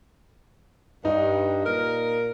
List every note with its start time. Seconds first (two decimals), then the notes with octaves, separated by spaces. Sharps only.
1.05 G2 D#4
1.66 A#2 A#4